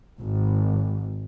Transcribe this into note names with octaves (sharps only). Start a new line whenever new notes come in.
G#1